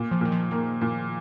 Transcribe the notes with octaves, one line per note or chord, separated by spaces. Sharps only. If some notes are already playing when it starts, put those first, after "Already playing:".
Already playing: A#2
F3
A#2 D#3
F3
D#3 A#3
A#2